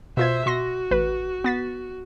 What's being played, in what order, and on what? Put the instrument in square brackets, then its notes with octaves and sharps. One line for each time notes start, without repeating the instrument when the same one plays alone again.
[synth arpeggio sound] B2 F4 G#6 [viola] C5 E5
[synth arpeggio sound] B2 C6 A#6 [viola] F#4
[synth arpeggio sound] A1 B4
B3 A6 B6